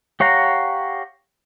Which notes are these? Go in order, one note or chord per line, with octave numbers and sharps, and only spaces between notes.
G4 C#5 F5 F#5 A#5